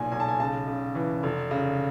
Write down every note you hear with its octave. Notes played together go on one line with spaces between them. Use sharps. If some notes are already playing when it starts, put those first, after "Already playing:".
Already playing: B1 A#2 G#5
B1 G#5
A5
G#5
C#3 A5
C#3
E3
F1
C#3